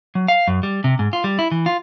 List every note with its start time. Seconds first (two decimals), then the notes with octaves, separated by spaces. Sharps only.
0.15 F#3
0.28 F5
0.48 F#2
0.63 G3
0.84 C3
0.99 G#2
1.13 F4
1.24 G3
1.39 E4
1.51 E3
1.66 F4